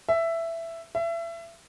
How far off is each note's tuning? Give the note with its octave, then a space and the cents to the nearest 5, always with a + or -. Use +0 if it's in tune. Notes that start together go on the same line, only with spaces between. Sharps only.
E5 +10
E5 +30